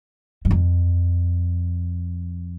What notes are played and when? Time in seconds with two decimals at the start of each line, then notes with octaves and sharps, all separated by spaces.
0.45 G2
0.51 F2